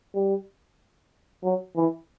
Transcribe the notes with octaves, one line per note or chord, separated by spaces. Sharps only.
G3
F#3
E3